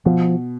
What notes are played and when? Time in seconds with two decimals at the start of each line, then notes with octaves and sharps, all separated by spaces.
0.05 B2 F3